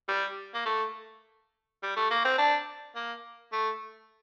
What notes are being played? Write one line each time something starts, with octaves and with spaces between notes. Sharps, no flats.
G3
A#3
A3
G3
A3
A#3
C4
D4
A#3
A3